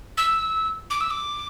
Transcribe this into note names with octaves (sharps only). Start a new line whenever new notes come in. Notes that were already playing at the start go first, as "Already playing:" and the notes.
E6
D6
E6
D6